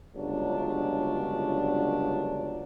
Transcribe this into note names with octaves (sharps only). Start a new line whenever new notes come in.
G1 C#2 A#2 C#3 F#3 D4